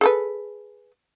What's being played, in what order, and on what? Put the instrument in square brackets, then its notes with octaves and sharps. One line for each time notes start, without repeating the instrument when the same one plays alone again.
[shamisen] G#4 A4 B4